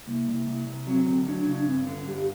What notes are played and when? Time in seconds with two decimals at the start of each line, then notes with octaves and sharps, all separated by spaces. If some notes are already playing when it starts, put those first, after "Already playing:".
0.07 C2 A#3
0.28 C2
0.47 C2
0.67 C2
0.87 F#3 C4
1.07 D2 C4
1.27 F#3 D4
1.46 C#3 D4
1.67 G2 C4
1.87 D3 C#4
2.07 G2 G4